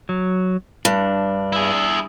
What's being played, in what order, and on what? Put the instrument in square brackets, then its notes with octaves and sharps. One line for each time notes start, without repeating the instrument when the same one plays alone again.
[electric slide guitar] F#3
[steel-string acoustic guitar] G2 [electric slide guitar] D4
[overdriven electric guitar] E4 G#4